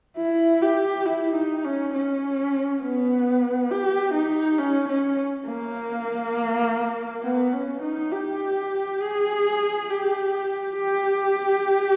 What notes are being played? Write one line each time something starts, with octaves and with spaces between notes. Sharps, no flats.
E4
G4
E4
D#4
C#4
C#4
B3
G4
D#4
C#4
C#4
A#3
B3
C#4
D#4
G4
G#4
G4
G4